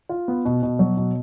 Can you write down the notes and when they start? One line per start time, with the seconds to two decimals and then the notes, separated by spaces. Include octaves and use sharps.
0.09 F4
0.28 B3
0.45 B2
0.63 B2
0.79 F#3
0.97 B2